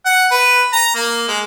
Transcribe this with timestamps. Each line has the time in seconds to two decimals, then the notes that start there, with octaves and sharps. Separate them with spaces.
0.05 F#5
0.31 B4
0.73 A#5
0.95 A#3
1.28 G#3